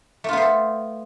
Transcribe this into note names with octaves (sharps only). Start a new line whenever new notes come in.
A3 B3 F4 A4 C5